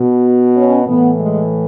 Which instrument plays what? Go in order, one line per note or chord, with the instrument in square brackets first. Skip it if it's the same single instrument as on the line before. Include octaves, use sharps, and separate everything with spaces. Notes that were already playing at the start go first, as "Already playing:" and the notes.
Already playing: [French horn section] B2
C#4
A2 E3 B3
G#3